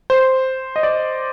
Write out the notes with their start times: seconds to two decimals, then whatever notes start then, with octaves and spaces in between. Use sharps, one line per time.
0.10 C5
0.76 D#5
0.83 D5